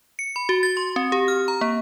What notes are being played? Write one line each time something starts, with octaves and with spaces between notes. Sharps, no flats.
C#7
B5
F#4
A6
C6
C4
G4
F6
A#5
A#3